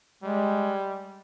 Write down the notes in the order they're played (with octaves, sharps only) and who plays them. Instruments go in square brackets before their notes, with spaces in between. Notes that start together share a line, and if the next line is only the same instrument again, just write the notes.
[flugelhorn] G3 [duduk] G#3